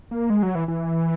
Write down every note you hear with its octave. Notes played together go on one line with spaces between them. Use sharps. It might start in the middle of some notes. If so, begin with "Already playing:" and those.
A#3
G#3
F#3
E3
E3